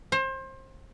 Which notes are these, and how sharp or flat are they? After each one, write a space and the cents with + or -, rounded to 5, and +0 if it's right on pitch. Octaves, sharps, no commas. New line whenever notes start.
C5 +30